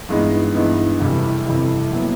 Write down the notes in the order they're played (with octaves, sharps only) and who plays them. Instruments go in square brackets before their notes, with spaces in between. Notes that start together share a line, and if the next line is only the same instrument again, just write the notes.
[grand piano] G2 E3 G#3 B3 D#4
G2 E3 G#3 B3 D#4
F2 C3 E3 G3
F2 C3 E3 G3
A#2 F#3 B3 E4